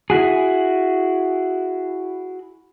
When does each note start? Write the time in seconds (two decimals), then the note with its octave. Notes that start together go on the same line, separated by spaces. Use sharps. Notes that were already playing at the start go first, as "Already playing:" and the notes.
0.10 E4 F#4 G#4